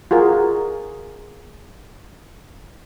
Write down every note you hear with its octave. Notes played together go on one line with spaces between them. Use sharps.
F4 F#4 G#4 A#4